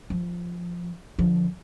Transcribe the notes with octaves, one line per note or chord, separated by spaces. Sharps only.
F3
D3 F3